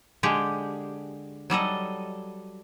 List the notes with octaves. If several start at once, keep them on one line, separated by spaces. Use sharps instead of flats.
D3 G#3 G4
F#3 G3 A4 D#5